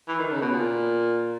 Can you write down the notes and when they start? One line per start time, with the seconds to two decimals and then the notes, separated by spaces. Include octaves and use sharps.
0.08 E3
0.20 D#3
0.31 C#3
0.42 B2
0.53 A#2